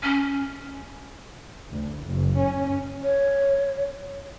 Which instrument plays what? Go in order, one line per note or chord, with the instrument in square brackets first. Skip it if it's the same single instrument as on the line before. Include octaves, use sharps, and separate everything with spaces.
[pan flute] C#4
[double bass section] D2
F#1
C#4
[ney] C#5